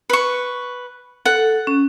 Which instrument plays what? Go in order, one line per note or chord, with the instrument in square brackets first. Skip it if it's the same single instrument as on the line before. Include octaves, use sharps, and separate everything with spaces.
[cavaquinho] B4 C#6
[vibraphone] A4 [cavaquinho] F#5
[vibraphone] C#4